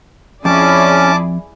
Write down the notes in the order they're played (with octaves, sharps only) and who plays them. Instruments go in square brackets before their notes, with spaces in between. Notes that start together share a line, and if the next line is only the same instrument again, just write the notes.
[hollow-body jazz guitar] F2 [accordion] C#4 [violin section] E4 G#4 D5 [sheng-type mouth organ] A5 D6